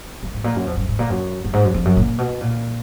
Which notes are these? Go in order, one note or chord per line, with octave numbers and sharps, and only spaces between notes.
F3
G#2
A#2
F#2
F2
F#2
G#2
A#2
F#2
F#2
G#2
F#2
F2
F#2
A#2
B2
A#2